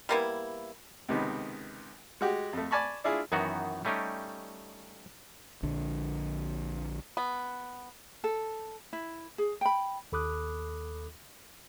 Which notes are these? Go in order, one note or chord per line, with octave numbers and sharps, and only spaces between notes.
G3 A#3 B3 E4
C#2 C3 D#3 B3
G#3 F#4 G4
F2 A3
D5 G#5 A5 B5 C#6
D4 E4 F4 G#4
F#2 D#3 E3 B3 D#4 F#4
G3 A3 C#4 D#4 G4
A#1 D3
B3
A4
E4
G#4
G5 B5
D#2 A4 B5 D6 D#6 F#6